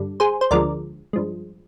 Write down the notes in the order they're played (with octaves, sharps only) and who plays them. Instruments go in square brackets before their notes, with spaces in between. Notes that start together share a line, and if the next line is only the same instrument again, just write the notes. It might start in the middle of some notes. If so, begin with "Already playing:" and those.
Already playing: [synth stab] G2 D3 G3
G#4 C5
C5
D2 D3 F3 G#3 A#4 D5
G2 F3 G#3